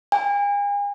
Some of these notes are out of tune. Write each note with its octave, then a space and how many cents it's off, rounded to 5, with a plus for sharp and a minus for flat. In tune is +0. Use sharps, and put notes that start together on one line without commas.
G#5 -40